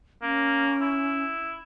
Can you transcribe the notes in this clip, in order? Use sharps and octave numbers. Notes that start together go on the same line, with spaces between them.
A#3 C#4
E4